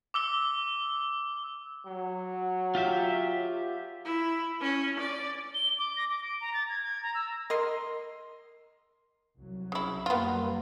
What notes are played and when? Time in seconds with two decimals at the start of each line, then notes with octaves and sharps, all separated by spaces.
0.14 D6 E6 G7
1.87 F#3
2.75 F4 G4 E5
4.05 E4
4.61 C#4
5.00 D5
5.54 G7
5.78 D6
5.97 A#6
6.10 D6
6.24 D7
6.41 A#5
6.54 A6
6.69 G#6
6.83 G#6
7.03 A#5
7.15 E6
7.50 A#4 D#5 C6
9.38 C2 F#3
9.72 C#3 E4
10.06 F#2 G3 A#3 B3 F4